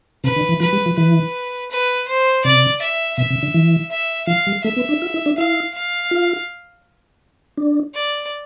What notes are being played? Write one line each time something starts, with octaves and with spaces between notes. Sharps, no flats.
C3 B4
D3
E3
F3 B4
G3
F3
E3 B4
B4
C5
C3 D5
E5
B2 E5
C3
D3
E3
E5
F3 F5
G3
A3 E5
B3
D4
F4
E4
D4
E4 F5
F5
F4
D4
D5